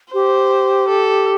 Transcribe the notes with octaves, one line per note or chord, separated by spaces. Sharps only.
G4 C5
A4